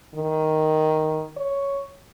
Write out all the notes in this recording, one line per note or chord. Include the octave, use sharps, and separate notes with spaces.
D#3
C#5